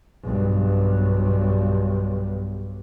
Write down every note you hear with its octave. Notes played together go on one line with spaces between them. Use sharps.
B1 G2